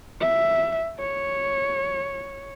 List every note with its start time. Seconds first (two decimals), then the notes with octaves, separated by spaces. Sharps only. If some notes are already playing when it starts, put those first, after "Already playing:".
0.21 E5
0.99 C#5